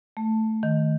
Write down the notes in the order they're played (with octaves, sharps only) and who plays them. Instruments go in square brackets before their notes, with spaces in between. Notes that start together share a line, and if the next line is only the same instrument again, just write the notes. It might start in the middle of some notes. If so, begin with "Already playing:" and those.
[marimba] A3
D#3